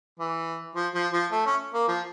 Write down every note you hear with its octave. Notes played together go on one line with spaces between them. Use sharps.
E3
F3
F3
F3
A3
C#4
A#3
F3